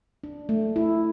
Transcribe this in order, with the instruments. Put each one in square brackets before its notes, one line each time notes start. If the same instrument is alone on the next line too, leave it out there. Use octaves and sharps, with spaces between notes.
[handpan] D4
A3
E4